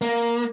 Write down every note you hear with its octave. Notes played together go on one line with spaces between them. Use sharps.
A#3